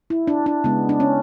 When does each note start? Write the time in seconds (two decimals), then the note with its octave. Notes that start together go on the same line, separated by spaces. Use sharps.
0.10 E4
0.27 D4
0.46 D4
0.64 C#3 G#3 B3
0.89 D4
1.00 C#4